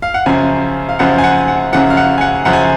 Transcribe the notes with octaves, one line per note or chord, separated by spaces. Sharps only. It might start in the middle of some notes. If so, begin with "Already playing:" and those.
F5
F#5
F#2 C#3 F3 G#5
F5
F#2 C#3 F3 F#5
G#5
F#5
F#5
F#2 C#3 F3 F#5
F5
F#5
G#5
F#5
F#2 C#3 F3 F#5
G#5